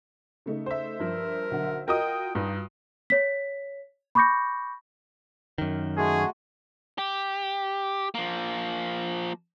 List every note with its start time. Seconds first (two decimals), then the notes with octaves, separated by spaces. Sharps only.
0.46 C#3 A3 D#4
0.66 C5 E5
0.99 G2 F3 A#4
1.51 B1 D3 F#5
1.88 F4 F#4 A#4 D#5 G5 D#6
2.35 G2 D#4
3.10 C#5 B6
4.15 B5 C#6 D6 G6 A#6 C#7
5.58 F#2 D#3
5.97 G#3 A3 F#4 G#4
6.98 G4
8.15 F3 A#3